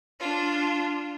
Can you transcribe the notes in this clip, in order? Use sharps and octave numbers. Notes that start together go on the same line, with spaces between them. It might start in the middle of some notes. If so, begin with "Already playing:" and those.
D4 F4